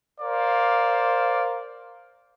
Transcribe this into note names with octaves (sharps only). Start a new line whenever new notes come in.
A#4 C5 D5 F5